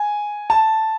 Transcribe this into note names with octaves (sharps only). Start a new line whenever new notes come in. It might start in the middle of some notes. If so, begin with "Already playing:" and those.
Already playing: G#5
A5